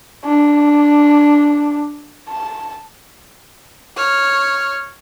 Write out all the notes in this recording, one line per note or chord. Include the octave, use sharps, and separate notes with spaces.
D4
A5
C#5 F6